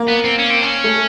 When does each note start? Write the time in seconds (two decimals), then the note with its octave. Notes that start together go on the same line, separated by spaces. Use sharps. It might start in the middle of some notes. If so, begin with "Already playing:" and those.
Already playing: A#3
0.08 B3
0.24 C4
0.39 C#4
0.51 C4
0.62 C#4
0.84 A3